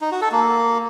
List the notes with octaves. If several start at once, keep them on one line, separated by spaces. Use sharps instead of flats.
D#4
F#4
A4
A#3